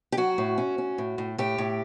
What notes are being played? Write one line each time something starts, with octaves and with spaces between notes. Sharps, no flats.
G4
F#3 F#4
A2
C#4
C#4
A2
A2
A2 G4
A2